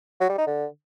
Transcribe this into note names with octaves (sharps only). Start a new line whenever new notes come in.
F#3
G3
D#4
D3